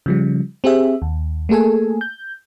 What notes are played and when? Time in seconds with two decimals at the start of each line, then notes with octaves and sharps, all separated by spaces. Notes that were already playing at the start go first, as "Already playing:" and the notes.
0.06 C#3 F3 G3
0.64 C4 G4 G#4 E5
1.02 D#2
1.49 A3 A#3 G#4 A4 G#5
2.01 G6